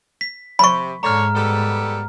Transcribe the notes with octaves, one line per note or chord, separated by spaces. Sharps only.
B6
C3 B5 C#6
G#2 D3 C#5 A#5 F6
G3 B3 A4